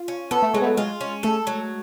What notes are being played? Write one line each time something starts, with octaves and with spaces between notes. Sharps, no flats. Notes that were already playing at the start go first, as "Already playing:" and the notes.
Already playing: F4
C#4
B3 A4
A3
F#3 G#3
B3
A3
G#3 F4
C#4
A3 A4
F#3